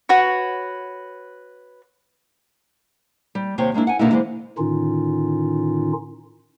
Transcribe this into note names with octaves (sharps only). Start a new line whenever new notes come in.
F#4 B4 C#5
G3
D#2 C3 D#3 C5 C#5 G5
G#3 A#3 D4 E4
F#5 G#5
B2 D3 A#3 B3 D#4 E4
E3 G#3 C5 D5
A2 D3 D#3 C#4 D#4 F4